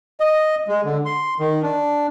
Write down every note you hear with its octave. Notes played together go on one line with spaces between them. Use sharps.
D#5
G#3
D3
C6
D#3
D4